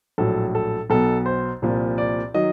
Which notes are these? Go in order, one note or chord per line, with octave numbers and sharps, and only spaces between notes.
A#1 A2 F#3 A4
A4
B1 B2 F#3 A4
C5
C2 A#2 F3
D5
D#3 F#3 D#5